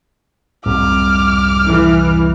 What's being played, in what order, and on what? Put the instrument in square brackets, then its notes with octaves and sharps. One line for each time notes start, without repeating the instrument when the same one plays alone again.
[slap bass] C2 F2 G#2 [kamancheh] D6 F6
[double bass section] E3